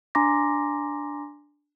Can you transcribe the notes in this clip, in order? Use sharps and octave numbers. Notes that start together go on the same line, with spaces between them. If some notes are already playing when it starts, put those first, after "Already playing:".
D4 G#5 A#5 C6 D6 A#6